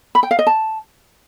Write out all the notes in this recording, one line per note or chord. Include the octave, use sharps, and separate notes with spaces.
B5
G5
F5
D#5
A5